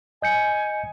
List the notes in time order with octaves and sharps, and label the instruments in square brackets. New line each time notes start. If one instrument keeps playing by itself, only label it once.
[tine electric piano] D#5 G6 C#7 [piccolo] G#5